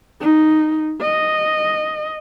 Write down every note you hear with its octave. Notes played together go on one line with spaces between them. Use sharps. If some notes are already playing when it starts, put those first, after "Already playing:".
D#4
D#5